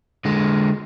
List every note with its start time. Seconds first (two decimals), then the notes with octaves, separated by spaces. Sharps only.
0.25 D3 G#3